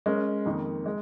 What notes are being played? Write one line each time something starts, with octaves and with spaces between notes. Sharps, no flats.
G#3 C#4 A#4
F2 D#3 A#3
G#3